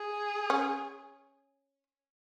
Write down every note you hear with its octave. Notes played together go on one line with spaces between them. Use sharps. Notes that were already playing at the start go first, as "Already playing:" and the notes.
Already playing: G#4
C#4